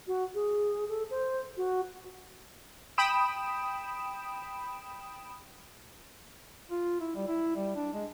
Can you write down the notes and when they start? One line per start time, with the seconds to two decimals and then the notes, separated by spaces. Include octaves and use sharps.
0.07 F#4
0.34 G#4
0.89 A4
1.10 C5
1.57 F#4
2.98 G5 B5 D#6 D7 E7
6.71 F4
7.01 E4
7.15 G3
7.28 E4
7.56 G3
7.76 D4
7.94 G#3